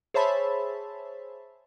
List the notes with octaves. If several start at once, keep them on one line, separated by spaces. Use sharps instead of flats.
G#4 C5 C#5 E5 A5 B5